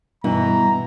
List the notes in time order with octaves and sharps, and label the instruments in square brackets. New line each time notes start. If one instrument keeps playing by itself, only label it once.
[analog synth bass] G2 [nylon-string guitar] B2 [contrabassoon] E3 [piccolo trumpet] A#5